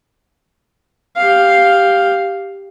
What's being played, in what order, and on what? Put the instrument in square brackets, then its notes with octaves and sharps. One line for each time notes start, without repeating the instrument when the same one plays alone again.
[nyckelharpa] G4 F5